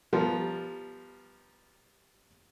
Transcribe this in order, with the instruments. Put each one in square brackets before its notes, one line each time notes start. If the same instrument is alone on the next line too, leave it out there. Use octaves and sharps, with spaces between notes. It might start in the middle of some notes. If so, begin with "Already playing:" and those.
[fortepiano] F3 G3 B3 A#4